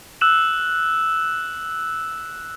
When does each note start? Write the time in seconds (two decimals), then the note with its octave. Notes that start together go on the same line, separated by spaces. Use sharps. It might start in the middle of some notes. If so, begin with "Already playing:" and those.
0.21 E6 F#6 E7 F#7